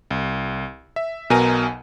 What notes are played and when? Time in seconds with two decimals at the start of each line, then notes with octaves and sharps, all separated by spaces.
0.11 C2
0.96 E5
1.30 B1 B2 A#4 G#5 A#5 D#7